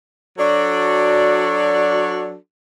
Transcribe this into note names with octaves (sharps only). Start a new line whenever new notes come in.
F#3 D4 F#4 A4 D5